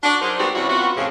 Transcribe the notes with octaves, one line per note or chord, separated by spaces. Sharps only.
D4 F#4
F#3 D#4 G#4 A#4 C5 D5
G#2 G3 B3 C4 F#4
C3 E3 G3 C#4 E4 F#4
B3 C4 F4 F#4
F2 A2 C#3